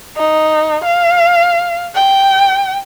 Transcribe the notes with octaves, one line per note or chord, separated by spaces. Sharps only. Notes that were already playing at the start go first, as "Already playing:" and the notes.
D#4
F5
G5